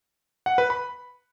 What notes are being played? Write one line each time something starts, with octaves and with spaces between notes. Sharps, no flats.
F#5
B4
B5